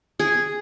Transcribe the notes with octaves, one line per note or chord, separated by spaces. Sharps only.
G#4